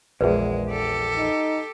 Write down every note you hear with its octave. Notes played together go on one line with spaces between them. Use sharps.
A#1 E2 G#3 G#4 B4
G4 A4
D#4